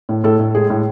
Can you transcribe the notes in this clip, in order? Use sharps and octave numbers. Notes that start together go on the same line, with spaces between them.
A2
A2 A4
A2
G#3 G#4
A2